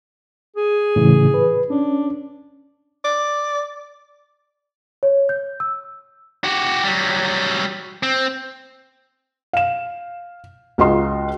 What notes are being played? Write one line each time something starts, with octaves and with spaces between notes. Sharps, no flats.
G#4
A2 C#3 E3
B4
C#4 D4
D5
C#5
G6
E6
F#4 G4
F#3 G3
C4
F5 E7
C#2 F4 F#4 D#5 C6